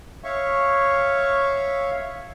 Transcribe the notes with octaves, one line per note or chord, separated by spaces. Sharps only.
C#5 E5 F5 C#6